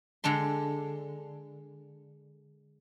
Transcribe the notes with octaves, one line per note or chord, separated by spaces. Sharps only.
D3 G#3 D4 C6